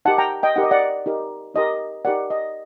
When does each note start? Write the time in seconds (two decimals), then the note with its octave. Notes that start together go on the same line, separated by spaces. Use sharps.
0.05 D#4 G4 A#4 F#5 A5
0.18 G5 A#5
0.43 D#5 G5
0.56 D#4 G4 A#4 F#5
0.63 D#5
0.71 D5 F#5
1.06 D#4 G4 A#4
1.55 D#4 G4 A#4 D#5
2.05 D#4 G4 A#4 D5 F#5
2.30 D#5